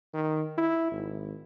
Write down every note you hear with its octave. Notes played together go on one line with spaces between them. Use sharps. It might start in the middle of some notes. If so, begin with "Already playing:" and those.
D#3
E4
G#1